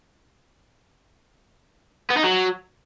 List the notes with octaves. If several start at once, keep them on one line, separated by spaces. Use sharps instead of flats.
B3
D#4
F#3